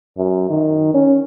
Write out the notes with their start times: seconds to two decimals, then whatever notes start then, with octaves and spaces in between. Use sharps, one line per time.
0.17 F#2
0.50 D#3
0.94 C#4